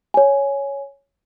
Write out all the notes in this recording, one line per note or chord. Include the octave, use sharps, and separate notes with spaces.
C#5 G#5